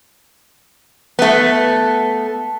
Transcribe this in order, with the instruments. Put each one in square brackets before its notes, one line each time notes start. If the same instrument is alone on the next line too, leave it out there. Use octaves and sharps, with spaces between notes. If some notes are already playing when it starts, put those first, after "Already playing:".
[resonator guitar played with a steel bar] A3 B3